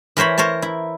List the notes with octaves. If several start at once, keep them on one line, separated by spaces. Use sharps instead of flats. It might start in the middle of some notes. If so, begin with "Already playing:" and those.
E3 A#4 C5 C#5 B5
A#4 C5 C#5 A5
E4